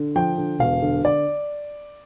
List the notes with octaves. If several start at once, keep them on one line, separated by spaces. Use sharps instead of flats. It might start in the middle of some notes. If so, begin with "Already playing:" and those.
Already playing: D3
F3 G5
D3
E1 F5
D3
D3 D5